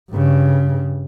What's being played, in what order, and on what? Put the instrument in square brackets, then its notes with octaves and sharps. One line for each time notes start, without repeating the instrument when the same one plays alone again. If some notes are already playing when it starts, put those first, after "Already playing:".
[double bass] G2 C#3